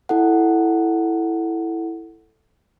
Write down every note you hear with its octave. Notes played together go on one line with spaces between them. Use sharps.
E4 A4 F#5